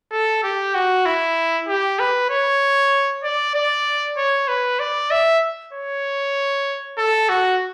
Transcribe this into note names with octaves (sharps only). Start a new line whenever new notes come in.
A4
G4
F#4
E4
G4
B4
C#5
D5
D5
C#5
B4
D5
E5
C#5
A4
F#4